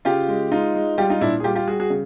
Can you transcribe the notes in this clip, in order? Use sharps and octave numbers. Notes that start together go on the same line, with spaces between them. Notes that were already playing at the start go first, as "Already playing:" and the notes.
C#3 F4 G4
G#3
G#3 D#4 F4
G#3
G3 F4 G4
D#4 F4
A#2 D4 E4
G#4
G3 F4 G4
F4 G4
G3 F#4 G#4
F#4 G#4
C#3